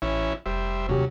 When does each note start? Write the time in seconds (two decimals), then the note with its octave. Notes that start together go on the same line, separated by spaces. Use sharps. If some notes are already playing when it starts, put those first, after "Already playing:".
0.02 A1 E3 C#4 E4
0.46 F1 G3 C5 E5
0.89 D#2 C3 F#3 C#4 G4